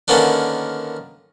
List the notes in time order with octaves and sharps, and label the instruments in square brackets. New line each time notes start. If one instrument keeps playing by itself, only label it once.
[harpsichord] D3 D#3 A#3 B3 C#4 D4